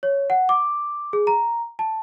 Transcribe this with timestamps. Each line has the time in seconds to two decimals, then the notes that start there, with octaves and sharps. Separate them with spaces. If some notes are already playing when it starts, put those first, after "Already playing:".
0.03 C#5
0.30 F#5
0.49 D6
1.13 G#4
1.27 A#5
1.79 A5